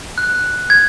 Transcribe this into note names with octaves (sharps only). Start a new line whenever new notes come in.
F#6
G#6